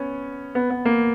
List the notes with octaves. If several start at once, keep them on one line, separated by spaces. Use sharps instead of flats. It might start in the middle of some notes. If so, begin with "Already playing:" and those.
Already playing: B3 C#4
B3
B3
A#3